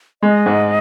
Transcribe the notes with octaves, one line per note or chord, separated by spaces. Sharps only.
G#3 D#5
G#2